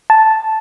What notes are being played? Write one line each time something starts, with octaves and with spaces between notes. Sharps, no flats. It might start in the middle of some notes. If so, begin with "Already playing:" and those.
A5